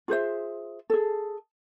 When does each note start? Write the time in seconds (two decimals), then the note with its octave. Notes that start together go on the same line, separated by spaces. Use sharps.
0.08 F4 G#4 C5 E5
0.90 G#4 A4